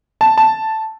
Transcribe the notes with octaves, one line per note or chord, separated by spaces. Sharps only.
A5
A5